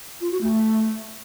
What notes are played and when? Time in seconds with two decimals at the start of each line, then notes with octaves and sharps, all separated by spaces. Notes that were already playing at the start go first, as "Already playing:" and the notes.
0.20 F4
0.31 F#4
0.41 A3